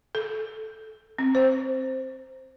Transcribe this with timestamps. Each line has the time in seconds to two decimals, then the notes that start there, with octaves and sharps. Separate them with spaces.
0.15 A4
1.18 C4
1.35 C5